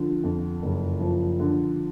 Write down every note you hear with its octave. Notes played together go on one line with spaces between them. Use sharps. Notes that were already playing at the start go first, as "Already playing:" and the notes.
Already playing: D3 F3
F2
F#1
F3
D3